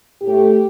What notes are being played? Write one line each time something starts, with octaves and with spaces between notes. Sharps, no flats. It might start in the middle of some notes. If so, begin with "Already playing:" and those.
A2 A3 G4